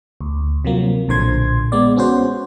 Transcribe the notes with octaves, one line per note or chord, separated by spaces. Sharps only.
D2
C3 F3 F#3 A#3
B1 A#2 D3 C5 C6 G#6
G#3 B3 D5
B3 C#4 F#4 C5